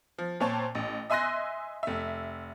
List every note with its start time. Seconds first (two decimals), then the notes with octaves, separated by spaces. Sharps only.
0.18 F3
0.40 A#2 C4 C#5 A5
0.75 A1
1.10 D#5 E5 G#5 C6 F#6 A#6
1.83 F1 E5